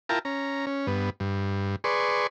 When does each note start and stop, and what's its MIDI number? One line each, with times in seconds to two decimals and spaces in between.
0.09 0.19 64
0.09 0.19 65
0.09 0.19 70
0.09 0.19 79
0.09 0.19 81
0.09 0.19 82
0.25 0.65 61
0.25 0.65 82
0.67 0.87 61
0.87 1.10 43
0.87 1.10 59
1.20 1.76 43
1.84 2.27 68
1.84 2.27 71
1.84 2.27 74
1.84 2.27 84
1.84 2.27 85